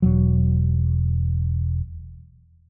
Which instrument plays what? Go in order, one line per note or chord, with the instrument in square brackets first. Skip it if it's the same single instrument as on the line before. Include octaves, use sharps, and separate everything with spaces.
[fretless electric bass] E1 F#3